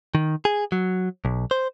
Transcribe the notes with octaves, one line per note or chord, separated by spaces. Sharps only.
D#3
G#4
F#3
B1
C5